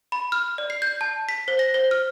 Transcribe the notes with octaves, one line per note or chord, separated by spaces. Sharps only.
B5
F6
D5
C7
G6
A5
B6
C5
A#6
C5
F6